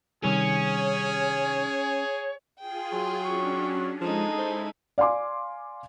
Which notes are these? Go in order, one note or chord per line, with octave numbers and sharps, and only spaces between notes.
C3 D#3 G3 C#4 G#4 C#5
F4 G#4 G5
F#3 C6
C#4 D4 C#6
F3 G#3 D#4 G#4 A4
E4 C5
D5 F5 G#5 C6 D6